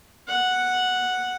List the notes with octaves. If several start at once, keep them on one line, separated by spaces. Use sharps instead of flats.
F#5